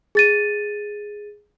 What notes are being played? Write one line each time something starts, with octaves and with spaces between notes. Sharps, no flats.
G#4 A6 D#7